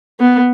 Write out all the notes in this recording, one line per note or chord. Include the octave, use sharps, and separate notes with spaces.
B3